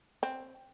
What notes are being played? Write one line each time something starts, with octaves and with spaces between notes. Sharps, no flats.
C4